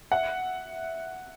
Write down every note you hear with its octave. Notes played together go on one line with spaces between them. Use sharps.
E5 F#5